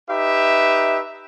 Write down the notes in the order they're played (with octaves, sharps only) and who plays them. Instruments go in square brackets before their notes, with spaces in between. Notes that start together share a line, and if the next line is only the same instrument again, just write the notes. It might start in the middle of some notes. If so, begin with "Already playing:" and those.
[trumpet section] D#4 G4 B4 E5